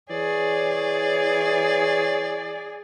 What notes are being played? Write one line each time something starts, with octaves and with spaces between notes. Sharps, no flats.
E3 G#4 C#5 D5